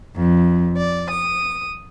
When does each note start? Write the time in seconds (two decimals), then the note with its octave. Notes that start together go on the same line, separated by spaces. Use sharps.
0.15 F2
0.78 D5
1.11 D#6